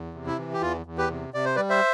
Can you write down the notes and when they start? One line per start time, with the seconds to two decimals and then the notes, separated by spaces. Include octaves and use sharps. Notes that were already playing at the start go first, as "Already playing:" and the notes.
Already playing: E2
0.14 C3
0.27 E4
0.38 E3
0.53 G4
0.61 E2 F4
0.86 E2
0.98 G4 B4
1.10 C3
1.34 C3 D5
1.45 C5
1.55 G3 B4 D5
1.70 C5 E5